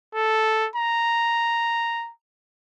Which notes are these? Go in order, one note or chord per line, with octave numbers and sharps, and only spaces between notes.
A4
A#5